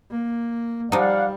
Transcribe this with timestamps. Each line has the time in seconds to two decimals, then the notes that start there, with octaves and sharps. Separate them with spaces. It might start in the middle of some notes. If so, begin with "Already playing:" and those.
0.11 A#3
0.92 F3 G3 D#4 D5 F5 F#5